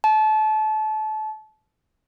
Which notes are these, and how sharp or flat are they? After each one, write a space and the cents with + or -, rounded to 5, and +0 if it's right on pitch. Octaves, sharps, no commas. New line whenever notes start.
A5 -30